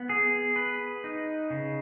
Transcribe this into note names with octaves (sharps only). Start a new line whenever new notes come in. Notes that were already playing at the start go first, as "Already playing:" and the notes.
Already playing: B3
G#4
B4
D#4
C#3